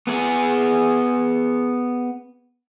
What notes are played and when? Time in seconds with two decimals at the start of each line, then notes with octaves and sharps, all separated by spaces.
0.07 B3 G#4